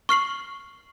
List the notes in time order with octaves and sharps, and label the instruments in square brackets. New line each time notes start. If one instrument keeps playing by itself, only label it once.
[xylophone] C#6 F6 C7 F#7